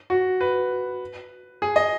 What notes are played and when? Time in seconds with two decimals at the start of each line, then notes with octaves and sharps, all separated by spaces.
0.10 F#4
0.41 B4
1.62 G#4
1.76 D#5